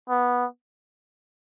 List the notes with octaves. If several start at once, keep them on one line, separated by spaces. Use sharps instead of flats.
B3